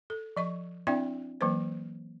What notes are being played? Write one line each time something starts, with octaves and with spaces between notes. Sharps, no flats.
A4
F3 D#5 C#6
C4 D4 E4 D5 E5 G5
E3 F#3 A#3 B4 C5